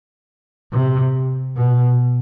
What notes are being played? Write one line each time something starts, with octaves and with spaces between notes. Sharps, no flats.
C3
B2